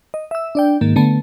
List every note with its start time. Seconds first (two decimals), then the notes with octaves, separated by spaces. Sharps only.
0.14 D#5
0.31 E5 E6
0.55 D4 D5 G5
0.81 G#2 D#3 A#3
0.96 D3 A3 B3 A5